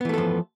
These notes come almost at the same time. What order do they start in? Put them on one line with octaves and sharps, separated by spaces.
B3 E3 A3 A4 F3